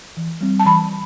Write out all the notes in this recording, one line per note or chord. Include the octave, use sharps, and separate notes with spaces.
E3
G3 C4
A5
E3 B5